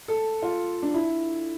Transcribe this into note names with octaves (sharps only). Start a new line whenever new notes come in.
A4
F4
D4
E4